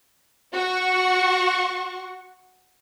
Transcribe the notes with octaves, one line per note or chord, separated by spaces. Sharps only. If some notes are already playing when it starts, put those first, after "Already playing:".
F#4 F#5 C#6